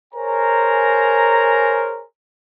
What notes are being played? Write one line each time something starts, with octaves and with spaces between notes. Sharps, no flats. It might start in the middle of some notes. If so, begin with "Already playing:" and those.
G#4 A#4 C5 C#5 G#5 A#5